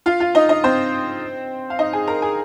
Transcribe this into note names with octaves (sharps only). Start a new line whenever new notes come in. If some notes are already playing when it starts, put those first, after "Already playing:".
F4 F5
F4 F5
D#4 D#5
D#4 D#5
C4 C5
F5
D#4 D#5
G#4 G#5
A#4 A#5
G#4 G#5